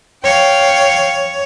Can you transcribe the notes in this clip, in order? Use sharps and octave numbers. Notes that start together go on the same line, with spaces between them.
C#5 F5 G5